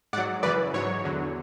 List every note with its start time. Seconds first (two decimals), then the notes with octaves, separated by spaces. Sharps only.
0.13 G#2 D5 F#5
0.17 F#3
0.43 F#2 C#3 E3 B4 D5
0.74 G#2 F#3 C#5
1.04 E2 D3 F#3